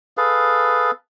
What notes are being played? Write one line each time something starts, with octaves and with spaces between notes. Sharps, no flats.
G#4 A4 B4 F5